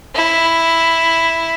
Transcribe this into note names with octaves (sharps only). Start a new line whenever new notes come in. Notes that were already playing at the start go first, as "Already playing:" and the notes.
E4